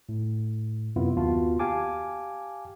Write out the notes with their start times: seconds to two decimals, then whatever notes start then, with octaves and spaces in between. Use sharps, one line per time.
0.09 A2
0.96 F#2 C3 B3 E4 F4
1.16 D#2 B3 F4 F#4 A5
1.59 G4 F5 G#5 A5 D6